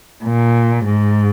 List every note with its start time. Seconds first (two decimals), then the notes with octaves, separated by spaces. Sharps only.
0.23 A#2
0.84 G#2